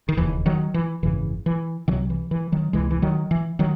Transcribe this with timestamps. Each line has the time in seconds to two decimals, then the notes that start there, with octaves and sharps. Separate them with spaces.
0.09 D#3
0.17 E1 D#2 C#3 E3
0.46 D#3 F#3
0.74 E3
1.03 G#1 F#2 C#3 E3
1.46 E3
1.88 C2 C3 D#3 F#3
2.10 E3
2.31 E3
2.52 D#3 F#3
2.73 C#2 C3 E3 G#3
2.91 E3
3.02 D#3 F#3
3.31 E3
3.59 D#3 F#3